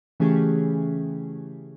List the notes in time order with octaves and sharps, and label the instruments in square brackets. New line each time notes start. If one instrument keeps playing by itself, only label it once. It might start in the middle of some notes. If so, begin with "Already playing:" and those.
[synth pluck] C#3 E3 A3 C#4 G4 G#4